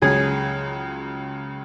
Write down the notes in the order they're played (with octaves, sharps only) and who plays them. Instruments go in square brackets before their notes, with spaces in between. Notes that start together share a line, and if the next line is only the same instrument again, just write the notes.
[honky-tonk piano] C#2 C#3 F#3 [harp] G#4